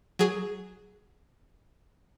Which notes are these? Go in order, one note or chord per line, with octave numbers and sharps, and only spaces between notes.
F#3 G#4